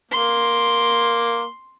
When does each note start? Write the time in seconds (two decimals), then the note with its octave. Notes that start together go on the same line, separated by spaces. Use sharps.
0.11 A#3 C6